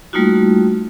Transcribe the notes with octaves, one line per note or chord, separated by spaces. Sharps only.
G3 A3 A#3 D#4 F4 F#4